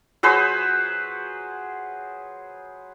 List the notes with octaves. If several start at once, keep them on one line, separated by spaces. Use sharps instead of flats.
F#3 G#4 B4 C5